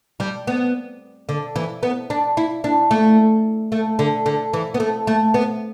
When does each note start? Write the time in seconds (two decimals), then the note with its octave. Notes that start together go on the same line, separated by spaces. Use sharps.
0.20 G3
0.47 B3
1.29 D3
1.56 E3
1.83 B3
2.10 D4
2.37 E4
2.64 D4
2.91 A3
3.72 A3
3.99 D3
4.26 D3
4.53 E3
4.74 B3
4.80 A3
5.07 A3
5.34 B3